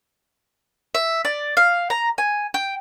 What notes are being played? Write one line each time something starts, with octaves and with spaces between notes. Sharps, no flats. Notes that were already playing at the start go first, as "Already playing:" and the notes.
E5
D5
F5
A#5
G#5
G5